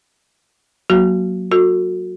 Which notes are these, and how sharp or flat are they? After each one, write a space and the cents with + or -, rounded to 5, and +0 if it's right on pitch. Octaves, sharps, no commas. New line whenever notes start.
F#3 +0 A#3 +15 F#4 +0
F#4 -25 A4 +30